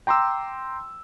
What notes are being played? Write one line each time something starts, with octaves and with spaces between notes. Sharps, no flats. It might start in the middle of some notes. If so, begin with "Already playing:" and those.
G5 A#5 C6 D6 E6